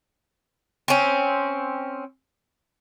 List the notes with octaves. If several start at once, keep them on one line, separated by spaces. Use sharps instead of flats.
C4 C#4